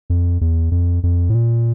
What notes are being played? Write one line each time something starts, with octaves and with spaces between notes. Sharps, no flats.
F2
E2
F2
F2
A2
A#2